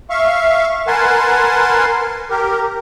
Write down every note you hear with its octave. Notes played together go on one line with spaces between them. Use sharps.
E5 F5 C#6
A#4 B4 F#5 G#5 A5 C6
G4 A#4